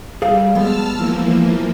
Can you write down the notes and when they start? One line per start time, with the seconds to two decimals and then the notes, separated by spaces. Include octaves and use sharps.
0.22 G3 G#4 A4 F5
0.55 F#3 G#3 B3 A5 E6 F6
0.97 E3 F3 A#3